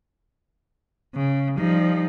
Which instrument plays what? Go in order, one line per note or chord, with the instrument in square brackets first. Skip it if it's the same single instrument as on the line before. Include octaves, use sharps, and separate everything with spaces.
[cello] C#3
[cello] F3 D#4 [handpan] G3